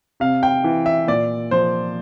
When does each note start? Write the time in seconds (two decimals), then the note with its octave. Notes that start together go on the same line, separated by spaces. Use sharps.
0.20 C3 F5
0.43 G5
0.64 E3
0.86 E5
1.08 A#2 D5
1.51 F3 C5